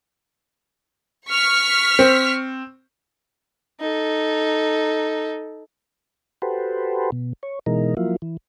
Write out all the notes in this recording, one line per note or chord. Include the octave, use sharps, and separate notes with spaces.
C#6 F6 B6
C4
D#4 A4
F#4 G4 A4 B4 C5
B2
C#5
B2 E3 G#3 D#4 A#4
F3 F#3 A#3 E4 F4
E3